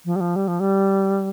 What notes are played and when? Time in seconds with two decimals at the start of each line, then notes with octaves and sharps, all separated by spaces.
0.05 F3
0.16 G3
0.20 F3
0.36 G3
0.48 F3
0.60 G3